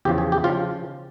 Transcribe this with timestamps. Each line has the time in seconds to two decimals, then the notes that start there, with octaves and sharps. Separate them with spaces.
0.05 E2 C#3 F3 G4
0.18 G#4
0.32 G4
0.44 C#3 F3 F4